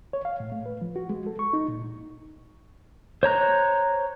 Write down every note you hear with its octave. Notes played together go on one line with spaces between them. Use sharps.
C#5
F5
A2
A3
B4
F3
F#4
G#3
A4
C#6
D#4
A#2
C5 C#5 A#5 F#6